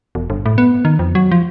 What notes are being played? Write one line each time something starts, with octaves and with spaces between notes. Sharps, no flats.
E1
G1
A2
B3
D#3
F2
F#3
F3